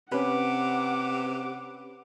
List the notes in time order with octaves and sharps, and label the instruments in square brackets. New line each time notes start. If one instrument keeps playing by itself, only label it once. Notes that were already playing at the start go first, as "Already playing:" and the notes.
[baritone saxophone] C3 [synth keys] C#4 B4 [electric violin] F#5 D6